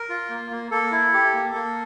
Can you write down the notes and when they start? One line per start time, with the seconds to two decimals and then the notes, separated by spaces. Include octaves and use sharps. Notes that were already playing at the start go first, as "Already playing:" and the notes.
Already playing: A#4
0.09 F4
0.30 A#3
0.51 A#3
0.71 A#3 A4
0.92 E4
1.13 G4
1.34 A#3
1.54 A#3